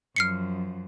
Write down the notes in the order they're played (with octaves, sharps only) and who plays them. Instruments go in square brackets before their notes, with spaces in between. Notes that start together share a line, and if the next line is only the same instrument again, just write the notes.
[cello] F#2 F3 [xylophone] F6 C7 C#7